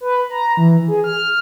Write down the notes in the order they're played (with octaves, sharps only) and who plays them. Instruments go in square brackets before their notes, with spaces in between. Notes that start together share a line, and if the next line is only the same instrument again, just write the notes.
[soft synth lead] B4
A#5
E3
G#4
F6